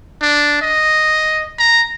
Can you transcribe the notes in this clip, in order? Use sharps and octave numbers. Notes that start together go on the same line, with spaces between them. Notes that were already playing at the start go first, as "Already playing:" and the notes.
D4
D#5
A#5